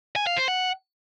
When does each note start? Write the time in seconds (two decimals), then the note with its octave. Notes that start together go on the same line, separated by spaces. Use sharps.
0.16 G#5
0.27 F5
0.37 C5
0.48 F#5